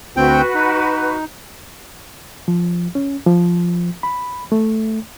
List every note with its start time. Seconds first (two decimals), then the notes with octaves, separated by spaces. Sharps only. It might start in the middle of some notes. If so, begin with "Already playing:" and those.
0.17 D2 C4 F#4 B4 G5
0.55 D#4
2.48 F3
2.95 C#4
3.26 F3
4.03 B5
4.52 A3